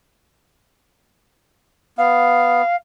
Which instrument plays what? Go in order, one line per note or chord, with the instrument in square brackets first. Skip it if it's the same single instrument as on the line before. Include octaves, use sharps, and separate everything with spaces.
[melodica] B3 [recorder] F5